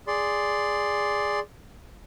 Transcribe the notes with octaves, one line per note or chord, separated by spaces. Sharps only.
G#4 D5 C6